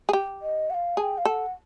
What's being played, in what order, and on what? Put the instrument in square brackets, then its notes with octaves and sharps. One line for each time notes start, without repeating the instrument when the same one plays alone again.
[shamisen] G#4
G4
[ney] D#5
F#5
F5
[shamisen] G#4 [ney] A5
[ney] G5
F5
[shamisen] A4 [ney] G5
[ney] F#5